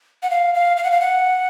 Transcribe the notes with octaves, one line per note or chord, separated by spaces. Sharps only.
F#5
F5
F5
F5
F#5
F5
F#5